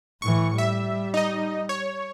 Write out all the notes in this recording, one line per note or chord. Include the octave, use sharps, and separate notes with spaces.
A2 E3 C#6
G3 E5
D#4 D#5
C#5